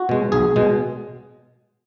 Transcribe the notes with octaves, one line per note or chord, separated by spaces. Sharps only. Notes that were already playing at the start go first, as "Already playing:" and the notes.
Already playing: F#4
B2 G#3
B1 G#4
B2 G#3